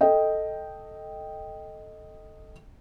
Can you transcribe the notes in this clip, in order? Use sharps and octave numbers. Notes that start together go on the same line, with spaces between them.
A4 D#5 G5